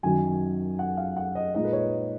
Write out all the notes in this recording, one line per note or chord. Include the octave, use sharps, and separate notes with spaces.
F#2 D#3 F#3 G#5
F#5
F5
F#5
D#5
A#2 G#3 D#4 D#5
B4
C#5